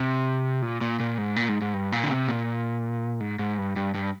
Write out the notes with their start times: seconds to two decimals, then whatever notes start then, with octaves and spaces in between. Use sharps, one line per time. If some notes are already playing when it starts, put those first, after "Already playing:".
Already playing: C3
0.62 A#2
0.81 A#2
1.00 A#2
1.18 G#2
1.36 A#2
1.49 G#2
1.61 G#2
1.74 G2
1.92 A#2
2.03 D3
2.10 C3
2.28 A#2
3.20 G#2
3.39 G#2
3.58 G2
3.76 G2
3.94 G2